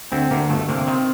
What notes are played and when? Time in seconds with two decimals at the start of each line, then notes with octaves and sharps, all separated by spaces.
0.12 D2 C4
0.31 D2 A#3
0.49 G1 A3
0.69 C3 A#3
0.87 D#3 C4